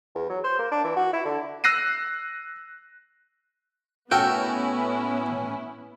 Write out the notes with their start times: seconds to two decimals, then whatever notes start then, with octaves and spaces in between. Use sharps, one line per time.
0.15 E2
0.30 F#3
0.44 C5
0.59 A#3
0.72 D4
0.84 E3
0.96 F#4
1.13 E4
1.25 D3
1.64 E6 F#6 A#6 C7 D#7
4.11 A2 B3 C#4 E4 F#4 A4 A#4 G5